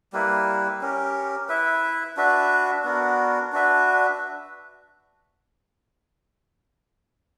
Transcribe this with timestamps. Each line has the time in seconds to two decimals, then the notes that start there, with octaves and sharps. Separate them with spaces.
0.13 G3 A#3 E4 B4
0.81 C#4 G4 A#4
1.49 E4 B4 E5
2.17 D4 F#4 B4 E5
2.84 B3 D4 F#4 A#4
3.52 D4 F#4 B4 E5